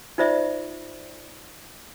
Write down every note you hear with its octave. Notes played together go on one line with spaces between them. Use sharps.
D#4 F4 C5 D5 E5